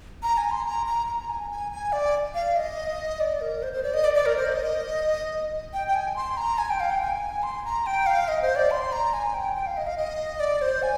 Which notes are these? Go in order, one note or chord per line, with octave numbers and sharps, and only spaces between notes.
A#5
G#5
C6
A#5
A#5
A#5
G#5
G#5
G#5
D5
F5
D#5
D5
A#4
C5
C5
D5
D#5
D5
D5
A#4
C5
D#5
G5
G5
G#5
C6
A#5
G#5
G5
F5
G5
G#5
C6
A#5
G5
F5
D#5
C5
D5
C6
A#5
G#5
G5
G5
F5
D#5
F5
D#5
D5
C5
G#5